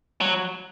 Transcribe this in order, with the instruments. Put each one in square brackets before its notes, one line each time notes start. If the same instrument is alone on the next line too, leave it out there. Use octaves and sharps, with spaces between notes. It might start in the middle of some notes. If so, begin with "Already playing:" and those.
[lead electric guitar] F#3